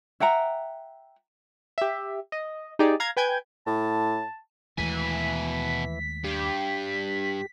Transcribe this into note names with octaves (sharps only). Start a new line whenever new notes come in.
E5 F#5 G5 A#5
G4 E5
D#5
D#4 G4 G#4 D5
F5 A#5 G#6
B4 G5 G#5 G6 G#6
A2 A5
D#2 B2 E3 G#3 A3 G#5 B6
G2 G4